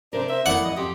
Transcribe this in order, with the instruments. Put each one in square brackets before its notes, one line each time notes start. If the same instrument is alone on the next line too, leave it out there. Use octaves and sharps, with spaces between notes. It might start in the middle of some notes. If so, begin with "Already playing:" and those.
[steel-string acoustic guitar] C3 A#4 [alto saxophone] D4 [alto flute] C5
[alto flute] C5 [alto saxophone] E5
[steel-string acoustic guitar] F2 A#3 [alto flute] E4 [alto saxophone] D5 [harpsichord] F#5
[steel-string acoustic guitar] E2 [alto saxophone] D#5
[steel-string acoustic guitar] F2 F3 [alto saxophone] G4 [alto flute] C6